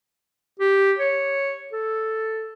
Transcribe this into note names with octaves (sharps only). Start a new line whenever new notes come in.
G4
C#5
A4